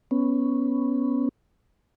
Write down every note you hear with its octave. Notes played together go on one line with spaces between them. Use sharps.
B3 C#4